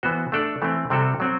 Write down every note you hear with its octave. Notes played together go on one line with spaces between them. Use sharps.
E3 B3 F#4 C5
A3 D4 A4 D5
E3 A3 C4
C3 G3 C4 F#4 A4
F#3 C4 F#4